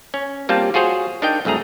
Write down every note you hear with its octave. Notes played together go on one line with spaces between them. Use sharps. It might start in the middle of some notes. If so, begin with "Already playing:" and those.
C#4
G3 A#3 C4 F4 G5 A5
F4 F#4 G#4 C5 C#5
D4 D#4 A#4 D#5 G5
C2 F#2 A3 G#4 A#5